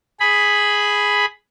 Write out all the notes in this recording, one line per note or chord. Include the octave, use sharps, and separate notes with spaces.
G#4 B5